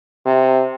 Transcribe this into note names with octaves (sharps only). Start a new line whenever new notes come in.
C3